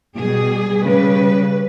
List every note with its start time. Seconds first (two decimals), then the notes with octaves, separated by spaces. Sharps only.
0.17 B2 G3 G#4
0.86 C#3 G3 B4